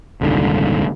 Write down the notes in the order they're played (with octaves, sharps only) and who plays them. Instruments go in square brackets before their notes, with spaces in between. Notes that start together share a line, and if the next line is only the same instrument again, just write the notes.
[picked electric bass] D#1 C2 G#2 D3